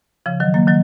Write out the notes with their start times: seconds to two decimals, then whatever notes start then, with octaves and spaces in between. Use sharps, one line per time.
0.26 C#3 F3
0.40 D#3 F#3
0.54 F#3 A#3
0.67 D#3 F#3